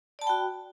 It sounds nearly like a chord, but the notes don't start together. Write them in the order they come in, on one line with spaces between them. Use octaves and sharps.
D5 A5 B5 G5 F#4